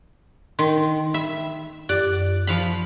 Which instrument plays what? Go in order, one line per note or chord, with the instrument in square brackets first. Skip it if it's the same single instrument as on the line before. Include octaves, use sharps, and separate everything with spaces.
[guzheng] D#3 [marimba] C6
[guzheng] E5 [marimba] B5
[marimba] F#2 G4 F#6 [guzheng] D5
[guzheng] F3 F5 B5